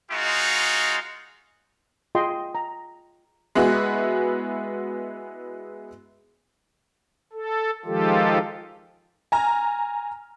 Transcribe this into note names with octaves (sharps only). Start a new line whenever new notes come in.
G#3 D#4 F4 F#4
F4 G#4 D#5 G5 C6
A#5
G#3 B3 E4 F#4 G#4
A4
D#3 F3 G#3 F4 G4 A4
G#5 A#5 F6